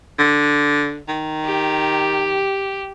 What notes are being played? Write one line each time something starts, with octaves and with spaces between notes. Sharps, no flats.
D3
D#3
G4